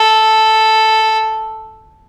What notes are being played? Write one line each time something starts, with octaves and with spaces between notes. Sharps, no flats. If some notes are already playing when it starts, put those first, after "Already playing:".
Already playing: A4